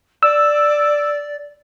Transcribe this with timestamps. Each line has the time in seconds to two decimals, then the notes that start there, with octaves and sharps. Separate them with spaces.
0.23 D5 E6